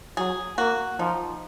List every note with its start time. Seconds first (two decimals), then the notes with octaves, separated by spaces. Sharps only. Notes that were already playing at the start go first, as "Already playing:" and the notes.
0.17 F#3 G#4
0.58 A#3 F#4
0.99 F3 D#4